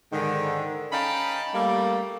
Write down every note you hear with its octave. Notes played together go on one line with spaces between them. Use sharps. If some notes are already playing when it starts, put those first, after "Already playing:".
G#2 D3 D#3
C#4 D#4 F5 G5 A5 B5
G3 A3 A#3